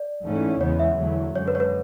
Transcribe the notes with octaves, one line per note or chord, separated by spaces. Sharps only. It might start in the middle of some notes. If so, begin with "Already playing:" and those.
Already playing: D5
G#2 E3 A3 C#4
E2 C#3 G#3 B3 C#5
E5
E2 D3 F#3 A3
F#2 D3 G#3 C#5
B4
C#5
B4